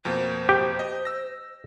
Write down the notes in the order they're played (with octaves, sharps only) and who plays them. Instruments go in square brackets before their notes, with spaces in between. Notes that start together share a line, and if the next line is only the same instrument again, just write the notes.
[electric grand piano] F2 B2 A#3 [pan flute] C5
[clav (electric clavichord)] G4
[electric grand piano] D#5
E6 A#6